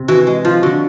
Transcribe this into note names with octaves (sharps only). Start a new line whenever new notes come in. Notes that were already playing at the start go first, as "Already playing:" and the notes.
Already playing: C3
E3 F#4
G#3
F3 F4
D3 F#4